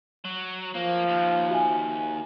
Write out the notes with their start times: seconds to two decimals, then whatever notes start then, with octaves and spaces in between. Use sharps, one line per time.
0.25 F#3
0.74 F3 A#3
1.08 D#2
1.50 F#4 E5 G#5